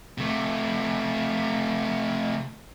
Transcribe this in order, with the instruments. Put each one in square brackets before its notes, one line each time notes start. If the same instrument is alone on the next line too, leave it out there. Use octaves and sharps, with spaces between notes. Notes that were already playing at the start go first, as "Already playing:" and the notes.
[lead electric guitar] C3 A3